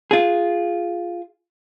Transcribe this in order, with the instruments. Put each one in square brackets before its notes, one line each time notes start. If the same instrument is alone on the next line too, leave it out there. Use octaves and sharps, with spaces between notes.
[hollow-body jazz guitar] F4 G#4